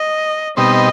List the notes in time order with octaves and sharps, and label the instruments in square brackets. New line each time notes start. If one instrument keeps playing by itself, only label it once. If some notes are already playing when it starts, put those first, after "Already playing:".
Already playing: [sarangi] D#5
[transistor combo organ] B2 G3 C4 D#4 [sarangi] D#5